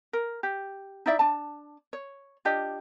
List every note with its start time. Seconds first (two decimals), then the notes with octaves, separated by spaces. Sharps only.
0.13 A#4
0.43 G4
1.06 D#4 E4 D5 E5
1.19 D4 A5
1.93 C#5
2.45 D4 F4 G4 D#5